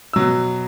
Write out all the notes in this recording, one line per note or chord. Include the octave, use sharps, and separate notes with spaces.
B2 F#3 E6